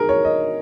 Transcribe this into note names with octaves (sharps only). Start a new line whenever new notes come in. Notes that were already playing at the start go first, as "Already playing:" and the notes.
Already playing: D#3 G#4 A#4
C#5
D#5